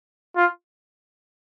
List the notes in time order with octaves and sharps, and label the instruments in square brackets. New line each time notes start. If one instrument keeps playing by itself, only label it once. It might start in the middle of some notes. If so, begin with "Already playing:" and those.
[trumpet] F4